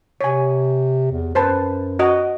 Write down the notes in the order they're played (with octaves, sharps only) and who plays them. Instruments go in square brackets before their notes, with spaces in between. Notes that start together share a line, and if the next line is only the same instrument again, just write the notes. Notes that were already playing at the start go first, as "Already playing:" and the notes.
[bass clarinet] C3 [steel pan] C#5 G#5
[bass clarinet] E2
[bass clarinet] F#2 [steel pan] B4 C5 A5
[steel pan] F#4 D#5